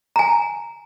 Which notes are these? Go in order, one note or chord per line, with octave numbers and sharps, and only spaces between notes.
G#5 A#5